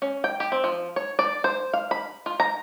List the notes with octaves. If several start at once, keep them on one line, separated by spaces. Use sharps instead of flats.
C#4
G5
G4
C4
F3
C#5
D5
C5
F5
B5
F4
A#5